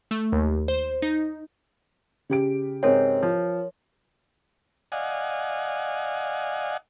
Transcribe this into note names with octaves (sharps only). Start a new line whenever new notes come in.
A3
D#2
C5
D#4
C#3 G4 D7
G#2 C4 A#4 C#5
F3
D5 D#5 F5 F#5 G#5